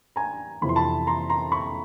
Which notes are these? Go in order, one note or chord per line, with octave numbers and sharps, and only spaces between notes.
G#5 A#5
F2 C3 E3 B5
C6
A5 B5
A#5 C6
A#5 C6
B5 C#6